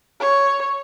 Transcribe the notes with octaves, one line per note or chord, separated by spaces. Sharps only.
C#5